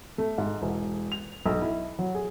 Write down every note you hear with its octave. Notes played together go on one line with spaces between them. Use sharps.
A3
G#2
E1
F7
B1
E4
F#3
G#4